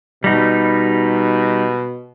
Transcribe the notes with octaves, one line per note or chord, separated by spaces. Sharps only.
B2 G3 D#4